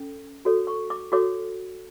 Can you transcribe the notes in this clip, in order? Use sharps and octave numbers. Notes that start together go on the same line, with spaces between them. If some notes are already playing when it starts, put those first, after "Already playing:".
Already playing: C#4 A4
F#4 A4 C#5
C#6
D6
F#4 A4 C#5 D6